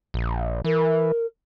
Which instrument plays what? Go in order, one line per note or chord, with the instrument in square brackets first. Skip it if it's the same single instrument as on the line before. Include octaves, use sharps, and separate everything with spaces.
[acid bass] A#1
[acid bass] E3 [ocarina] A#4